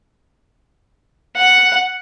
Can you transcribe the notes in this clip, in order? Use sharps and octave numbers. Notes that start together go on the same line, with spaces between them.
F#5